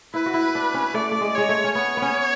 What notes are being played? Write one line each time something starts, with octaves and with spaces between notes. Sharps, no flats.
E4 B4
F#4
E4
D4
C#4
A3 D5
A3
G#3
G#3 C#5
A3
C#4
B3 C#5
B3
C#4